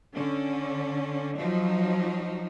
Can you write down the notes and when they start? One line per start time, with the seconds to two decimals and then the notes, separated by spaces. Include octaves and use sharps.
0.14 D3 C#4
1.39 F3 F#3 D#4